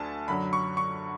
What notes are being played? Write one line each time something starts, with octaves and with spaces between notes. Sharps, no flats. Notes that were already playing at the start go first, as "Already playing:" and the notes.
Already playing: D2 D3 G#5 A5
F#2 D3 F#3 B5
C#6
C#6